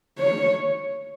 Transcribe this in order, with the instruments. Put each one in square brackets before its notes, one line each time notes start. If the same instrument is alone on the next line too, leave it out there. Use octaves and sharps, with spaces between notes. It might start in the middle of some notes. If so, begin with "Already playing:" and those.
[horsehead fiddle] C#5